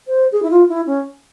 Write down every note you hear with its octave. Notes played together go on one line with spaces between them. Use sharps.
C5
G#4
E4
F4
E4
C#4